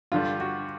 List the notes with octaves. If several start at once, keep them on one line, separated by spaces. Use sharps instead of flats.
G2 D3 G3 F4
F#4